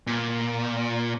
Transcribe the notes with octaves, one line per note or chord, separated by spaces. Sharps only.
A#2